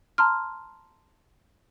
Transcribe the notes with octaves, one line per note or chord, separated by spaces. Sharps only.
A5 A#5 C6 F6